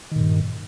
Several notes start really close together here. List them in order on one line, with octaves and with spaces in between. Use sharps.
D#3 A#2 G2